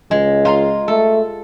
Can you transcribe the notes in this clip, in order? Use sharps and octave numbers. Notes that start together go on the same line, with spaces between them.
C#2 G#3
F4 A#5 C6
A3 A4